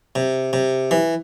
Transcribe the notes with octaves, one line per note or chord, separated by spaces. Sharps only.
C3
C3
E3